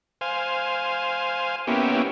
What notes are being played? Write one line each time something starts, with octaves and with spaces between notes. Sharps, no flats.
C5 F5 G#5
A#3 B3 C#4 E4 G4